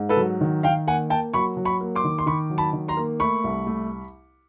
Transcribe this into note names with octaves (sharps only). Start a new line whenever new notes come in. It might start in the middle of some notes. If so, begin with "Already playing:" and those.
Already playing: G#2
A4 B4
F#3
D#3
D#3 F5 G5
A#3 F#5 G#5
A#3 G5 A5
F#3 B5 C#6
F#3
B5 C#6
A#3
C6 D6
D#3
C6
D#3 B5 C#6
F#3
A5 B5
D#3
A#5 C6
A#3
A3 B5 C#6
C2
A3